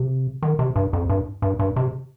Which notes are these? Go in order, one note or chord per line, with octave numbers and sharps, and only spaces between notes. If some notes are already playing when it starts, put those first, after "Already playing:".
Already playing: C3
D#3
C3
G2
F2
G2
G2
G2
C3